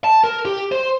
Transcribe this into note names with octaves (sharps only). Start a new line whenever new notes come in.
A5
A#4
G4
C5